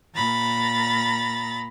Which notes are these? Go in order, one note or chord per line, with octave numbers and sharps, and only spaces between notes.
A#2 A#5 B5 A6